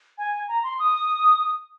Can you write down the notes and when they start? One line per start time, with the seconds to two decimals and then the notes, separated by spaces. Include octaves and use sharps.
0.18 G#5
0.48 A#5
0.64 C6
0.79 D#6